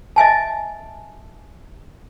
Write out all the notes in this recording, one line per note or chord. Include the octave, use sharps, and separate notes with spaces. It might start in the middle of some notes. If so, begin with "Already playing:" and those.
D#5 E5 G#5 A5